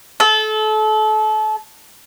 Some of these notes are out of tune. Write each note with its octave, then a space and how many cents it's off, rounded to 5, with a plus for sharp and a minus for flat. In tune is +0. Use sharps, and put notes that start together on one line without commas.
A4 -30